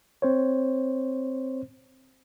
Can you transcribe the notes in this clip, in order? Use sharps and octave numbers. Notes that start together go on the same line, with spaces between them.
C4 C5 C#5